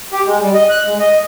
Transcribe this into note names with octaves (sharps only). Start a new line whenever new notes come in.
G4
G#3
G3
D#5
F#6
G#3
D#5